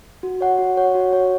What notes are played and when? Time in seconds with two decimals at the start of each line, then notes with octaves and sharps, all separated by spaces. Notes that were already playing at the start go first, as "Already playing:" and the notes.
0.23 F#4
0.41 C#5 F#5
0.59 F#4
0.77 C#5 F#5
0.95 F#4
1.13 C#5 F#5